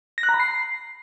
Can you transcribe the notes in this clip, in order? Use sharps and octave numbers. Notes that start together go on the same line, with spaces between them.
A#6
F#6
A#5
B5
C7